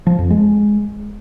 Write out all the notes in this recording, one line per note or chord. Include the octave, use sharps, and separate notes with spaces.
F3
F2
G#3